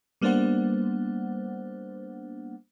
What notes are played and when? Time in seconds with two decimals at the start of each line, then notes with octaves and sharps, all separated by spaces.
0.21 G3 A#3 B3 D4 C5 F#5